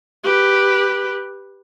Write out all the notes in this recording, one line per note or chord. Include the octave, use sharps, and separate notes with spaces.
G4 B4